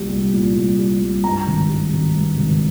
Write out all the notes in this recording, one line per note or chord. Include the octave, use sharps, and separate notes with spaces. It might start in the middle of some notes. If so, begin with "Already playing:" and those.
Already playing: C2 A#2 G3
C2
A#2
C2
G3
C2
G2 A#5
G#1
G3
G#1
G2
G#1